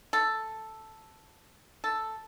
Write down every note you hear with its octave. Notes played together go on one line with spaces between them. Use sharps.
A4
A4